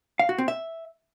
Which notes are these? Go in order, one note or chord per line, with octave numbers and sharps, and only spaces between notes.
F5
F#4
C4
E5